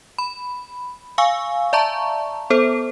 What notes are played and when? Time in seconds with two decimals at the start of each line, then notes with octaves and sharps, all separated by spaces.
0.18 B5
1.18 F5 G#5 C#6 E6
1.73 D5 E5 A5 A#5 C#6
2.50 B3 A4 C5